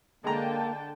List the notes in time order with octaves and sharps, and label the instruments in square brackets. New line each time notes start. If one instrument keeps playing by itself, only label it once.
[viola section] D3 G5 A5 [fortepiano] G#3 A#5 [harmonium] A#3